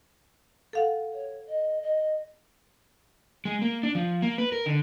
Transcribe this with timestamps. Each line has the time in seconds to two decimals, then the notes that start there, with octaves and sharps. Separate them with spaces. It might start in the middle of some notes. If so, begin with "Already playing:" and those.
0.73 A4 F5 F#5
1.13 C#5
1.48 D#5
1.82 D#5
3.45 G#3
3.62 A#3
3.83 D4
3.95 F3
4.22 A#3
4.38 B4
4.52 A#4
4.66 D3